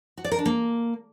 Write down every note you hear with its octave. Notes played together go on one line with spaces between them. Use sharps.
F#4
D5
A#4
D4
A#3